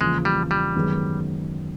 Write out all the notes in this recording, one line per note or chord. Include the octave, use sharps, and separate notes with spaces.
E2 C#3 F3 G#3 A#3
G3
G3
F#2 D#3 G#3 B3